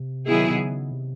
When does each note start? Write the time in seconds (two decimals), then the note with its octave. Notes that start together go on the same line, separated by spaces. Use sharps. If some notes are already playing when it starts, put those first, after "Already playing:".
Already playing: C3
0.27 D#3 F#3 B3 E4 G#4
0.50 C3
0.59 C#3
0.91 C3